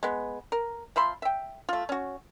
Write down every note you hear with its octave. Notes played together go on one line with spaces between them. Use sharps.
G#3 B3
A#4
F3 E5 B5 C6
E5 G5
A3 F4
C#4 F#4